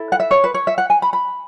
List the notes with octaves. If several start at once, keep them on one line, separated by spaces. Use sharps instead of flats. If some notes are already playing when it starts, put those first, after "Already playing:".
Already playing: E4 A4
F#5
E5
C#5
B4
C#5
E5
F#5
G#5
B5
B5